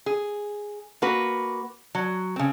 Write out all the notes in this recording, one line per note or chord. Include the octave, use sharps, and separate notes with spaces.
G#4
A#3 F#4 B4
F#3
C#3 C4